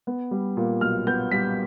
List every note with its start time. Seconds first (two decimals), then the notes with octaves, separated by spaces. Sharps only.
0.07 B3
0.31 G3
0.57 A#2
0.81 B1 F6
1.07 B3 G6
1.31 G3 B6